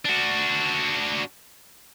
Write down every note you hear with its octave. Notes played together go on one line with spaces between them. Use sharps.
D4 F#4